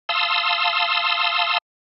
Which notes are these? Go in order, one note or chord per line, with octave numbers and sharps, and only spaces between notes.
F5 A5 C6 D#6 E6